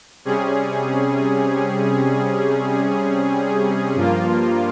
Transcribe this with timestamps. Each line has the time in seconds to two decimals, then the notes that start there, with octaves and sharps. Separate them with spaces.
0.25 C3 G3 C#4 G#4
3.95 G2 F3 A#3 F4